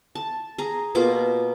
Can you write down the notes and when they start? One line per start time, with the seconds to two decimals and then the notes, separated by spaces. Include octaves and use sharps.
0.15 A5
0.58 G#4 A#5
0.95 B2 A#3 F4 D6